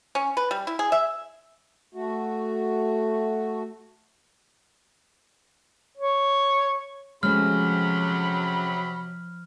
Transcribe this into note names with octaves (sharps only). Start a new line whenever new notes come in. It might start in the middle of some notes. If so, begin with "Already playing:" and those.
C#4
B4
G3
E4
G#4
E5
A3 F#4
C#5
C3 F3 F#3 G#3 A3 C#4 B5 F6